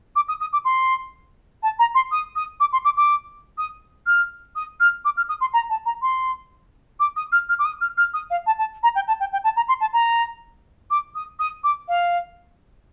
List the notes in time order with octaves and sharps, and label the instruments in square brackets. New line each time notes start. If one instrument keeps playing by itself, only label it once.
[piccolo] D6
D#6
D#6
D6
C6
A5
A#5
C6
D#6
D#6
D6
C6
D6
D6
D#6
F6
D#6
F6
D6
F6
D#6
C6
A#5
A5
A#5
C6
D6
D#6
F6
F6
D6
D#6
F6
F6
D#6
F5
A5
A5
A#5
G5
A5
G5
G5
A5
A#5
C6
A5
A#5
D6
D#6
D#6
D6
F5